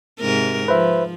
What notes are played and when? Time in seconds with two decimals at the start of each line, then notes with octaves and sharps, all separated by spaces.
0.20 G#2 C3 A#4
0.68 F3 B4 C5 E5